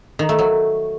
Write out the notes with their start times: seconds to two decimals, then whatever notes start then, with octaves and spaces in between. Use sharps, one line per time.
0.19 D#3
0.29 A3
0.39 F#3